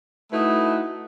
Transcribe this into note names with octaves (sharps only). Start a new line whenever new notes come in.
A3 D#4 E4 F#4 B4